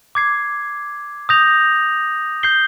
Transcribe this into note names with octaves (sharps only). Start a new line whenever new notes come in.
D6 G#6 C7
D#6 G6 A#6 F7
G6 C7 G7